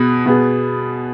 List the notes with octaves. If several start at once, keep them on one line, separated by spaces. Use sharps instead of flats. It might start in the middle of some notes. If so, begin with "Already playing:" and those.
Already playing: B2 B3 G#4
B2 B3 G#4